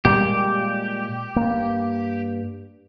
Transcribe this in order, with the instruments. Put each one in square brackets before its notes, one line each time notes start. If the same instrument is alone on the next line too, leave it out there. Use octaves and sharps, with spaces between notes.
[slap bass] A#2 G3 G#3 [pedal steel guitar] G4
[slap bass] G2 A#3